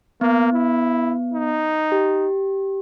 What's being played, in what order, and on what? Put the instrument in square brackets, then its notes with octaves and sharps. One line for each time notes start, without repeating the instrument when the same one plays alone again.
[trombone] A#3 [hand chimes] B3
[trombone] E4
D#4
[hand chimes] G4